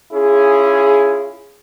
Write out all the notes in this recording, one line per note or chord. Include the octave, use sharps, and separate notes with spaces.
C#4 E4 F4 G#4